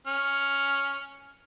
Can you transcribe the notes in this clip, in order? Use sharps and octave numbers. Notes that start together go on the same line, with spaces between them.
C#4 F6